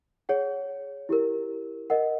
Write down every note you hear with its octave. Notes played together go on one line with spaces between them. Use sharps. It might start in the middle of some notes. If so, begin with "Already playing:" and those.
G#4 C#5 F#5
E4 G4 A#4
A#4 D#5 F#5